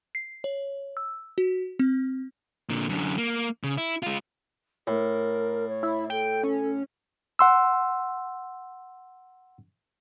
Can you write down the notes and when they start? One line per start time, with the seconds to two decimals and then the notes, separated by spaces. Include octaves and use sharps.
0.15 C7
0.44 C#5
0.97 E6
1.38 F#4
1.79 C4
2.69 A#2 D3
2.89 F#2 D3
3.18 A#3
3.63 C#3
3.78 E4
4.03 G#3 F4
4.87 A2 A#4
5.68 C#5
5.83 E4
6.10 A4 G5
6.43 C#4
7.39 F#5 C6 E6